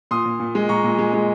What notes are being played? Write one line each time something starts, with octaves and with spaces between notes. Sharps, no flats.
A#2 C6 D#6
A#2
A#2
G#3
A#2 A#5 C#6
A#2
G#3
G#3